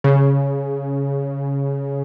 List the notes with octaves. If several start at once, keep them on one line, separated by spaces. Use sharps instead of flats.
C#3